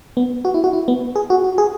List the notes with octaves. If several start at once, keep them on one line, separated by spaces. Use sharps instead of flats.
B3
F#4
E4
F#4
E4
B3
G#4
F#4
F#4
G#4